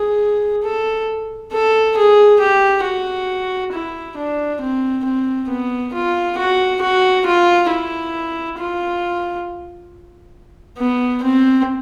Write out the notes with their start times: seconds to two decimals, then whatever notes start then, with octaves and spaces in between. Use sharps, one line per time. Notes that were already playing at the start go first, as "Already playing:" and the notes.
Already playing: G#4
0.63 A4
1.53 A4
1.97 G#4
2.40 G4
2.84 F#4
3.73 E4
4.17 D4
4.61 C4
5.05 C4
5.50 B3
5.93 F4
6.37 F#4
6.82 F#4
7.26 F4
7.70 E4
8.58 F4
10.79 B3
11.23 C4